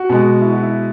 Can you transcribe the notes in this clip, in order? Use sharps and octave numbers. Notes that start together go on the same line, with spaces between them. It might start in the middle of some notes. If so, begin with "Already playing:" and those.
Already playing: F#4
B2 G#3
E4
F#4
E4